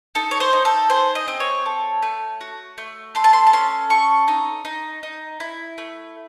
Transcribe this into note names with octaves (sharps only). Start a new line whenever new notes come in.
D#4 A4
C#5
C5
D#4
A4
G#4 C5
D#5
C4
C#5
A4
A3
F#4
A3
A4 C6
A5
C6
A5
C#4 C6
A4 C#6
D#4
D#4
D#4
E4
A3